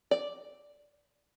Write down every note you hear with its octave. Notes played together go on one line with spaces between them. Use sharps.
D5